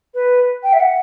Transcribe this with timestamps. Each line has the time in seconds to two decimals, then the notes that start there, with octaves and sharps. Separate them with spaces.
0.14 B4
0.63 G5
0.73 E5
0.80 F#5